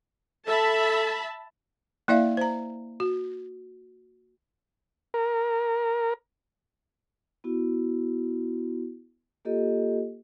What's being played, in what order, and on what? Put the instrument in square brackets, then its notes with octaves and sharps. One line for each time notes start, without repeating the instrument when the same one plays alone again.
[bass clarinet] A4 [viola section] E5 A5 B5
[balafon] A#3 E4 D5 E5 F5
C5 A#5
F#4
[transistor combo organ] A#4
[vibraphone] B3 E4 F#4
A#3 F4 G4 A4 D#5